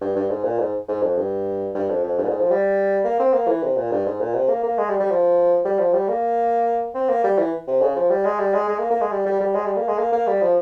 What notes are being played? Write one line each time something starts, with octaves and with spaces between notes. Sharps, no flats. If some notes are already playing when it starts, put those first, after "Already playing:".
G2
G2
G#2
A#2
G#2
G#2
F2
G2
G2
F2
F2
G2
A#2
G#2
F3
G3
A#3
C4
A#3
E3
C3
A#2
G2
G#2
A#2
C3
A#3
A#3
G#3
G3
G3
F3
G3
F3
G3
A#3
C4
A#3
G3
E3
C3
C#3
F3
G3
G#3
G3
G#3
G#3
A#3
A#3
G#3
G3
G3
G3
G#3
G3
A#3
G#3
A#3
A#3
G3
F3